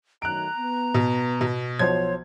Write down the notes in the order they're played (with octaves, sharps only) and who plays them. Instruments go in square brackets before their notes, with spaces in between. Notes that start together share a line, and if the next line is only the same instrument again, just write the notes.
[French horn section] D#3 F#3 A3 [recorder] A#5 [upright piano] F#6 D7
[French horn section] B3
[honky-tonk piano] B2
B2
[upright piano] B1 F3 C5 [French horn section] F#4 [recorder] C#5 [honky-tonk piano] G#6